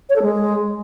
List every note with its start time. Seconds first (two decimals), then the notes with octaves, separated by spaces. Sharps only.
0.09 C#5
0.16 A4
0.22 G#3